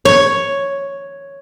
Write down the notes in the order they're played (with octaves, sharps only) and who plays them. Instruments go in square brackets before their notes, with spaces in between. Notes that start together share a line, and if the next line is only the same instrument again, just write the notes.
[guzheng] C#5